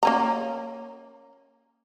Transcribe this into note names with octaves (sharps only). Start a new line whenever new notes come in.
A#3 C#4 A#5